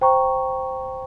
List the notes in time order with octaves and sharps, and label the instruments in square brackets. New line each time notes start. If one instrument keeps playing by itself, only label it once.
[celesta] C5 G5 A#5 C#6